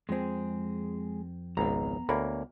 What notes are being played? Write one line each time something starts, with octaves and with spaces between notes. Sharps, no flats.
F2 G#3 C4 G#4
G#1 C#2 B3 A#5
D2 A#3 A#4 C#5 B5